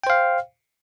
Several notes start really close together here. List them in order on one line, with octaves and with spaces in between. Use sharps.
G5 C5 F5